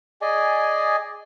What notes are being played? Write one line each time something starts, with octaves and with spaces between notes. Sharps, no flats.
G#4 D5 D#5 G#5